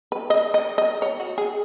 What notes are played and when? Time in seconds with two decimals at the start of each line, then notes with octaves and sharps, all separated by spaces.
0.12 B4
0.30 D#5
0.54 D#5
0.78 D#5
1.02 C#5
1.20 F#4
1.38 G#4